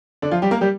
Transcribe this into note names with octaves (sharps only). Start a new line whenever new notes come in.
D3 D4
F3 F4
G3 G4
A#3 A#4
G3 G4